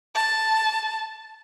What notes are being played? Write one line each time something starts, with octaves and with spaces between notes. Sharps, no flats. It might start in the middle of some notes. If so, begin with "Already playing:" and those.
A5